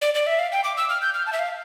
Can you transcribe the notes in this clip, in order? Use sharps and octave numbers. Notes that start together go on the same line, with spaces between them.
D5
D5
E5
F5
G5
D6
E6
F6
G6
F6
A5
E5
F5